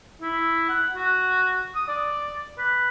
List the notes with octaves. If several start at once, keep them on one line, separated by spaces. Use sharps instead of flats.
E4
F#5
F#4
D#6
D5
B4